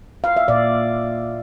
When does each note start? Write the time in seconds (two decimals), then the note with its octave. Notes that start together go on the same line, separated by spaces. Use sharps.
0.24 F5
0.37 E5
0.48 A#2 D5